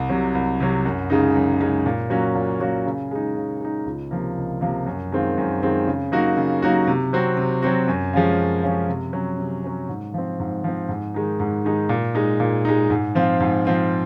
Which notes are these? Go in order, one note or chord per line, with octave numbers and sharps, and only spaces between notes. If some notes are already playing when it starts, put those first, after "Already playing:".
Already playing: C2
C3 F#3
C2
C3 F#3
F#2
C#3 G#3 D#4
F#2
C#3 G#3 D#4
A#2
F#3 A#3 C#4 F#4
A#2
F#3 A#3 C#4 F#4
C#3
G#3 D#4
C#3
G#3 D#4
C#2
C3 F3 A#3
C#2
C3 F3 A#3
F#2
D#3 G#3 C4 F4
F#2
D#3 G#3 C4 F4
C#3
F#3 A#3 D#4 F#4
C#3
F#3 A#3 D#4 F#4
C3
F#3 C4 F#4
C3
F#3 C4 F#4
F#2
F3 G#3 C#4 F4
F#2
F3 G#3 C#4 F4
C3
F#3 C#4
C3
F#3 C#4
G#2
F3 C4
G#2
F3 C4
G#2
D#3 G#3 D#4
G#2
D#3 G#3 D#4
A#2
G#3 D#4
A#2
G#3 D#4
G#2
F3 C4 F4
G#2
F3 C4 F4